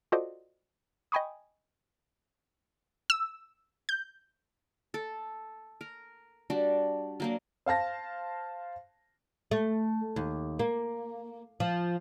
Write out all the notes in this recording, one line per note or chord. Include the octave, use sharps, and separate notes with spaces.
F4 F#4 A4 C5 D5 D#5
D#5 G5 G#5 B5 C#6 D#6
E6
G6
A4
A#4
G3 D4 F#4
F#3 A#3 D4
C5 F5 A5 A#6
A3
D#2
A#3
F3